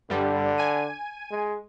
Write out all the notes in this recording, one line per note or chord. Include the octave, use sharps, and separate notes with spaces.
G2 D3 G3
G#5 D#7
G#3